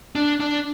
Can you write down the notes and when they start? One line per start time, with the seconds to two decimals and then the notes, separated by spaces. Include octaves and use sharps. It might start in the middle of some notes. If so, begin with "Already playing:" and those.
0.15 D4
0.40 D4